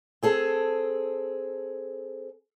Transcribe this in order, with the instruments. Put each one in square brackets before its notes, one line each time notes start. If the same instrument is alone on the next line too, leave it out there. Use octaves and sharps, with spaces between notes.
[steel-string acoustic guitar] C4 G#4 A4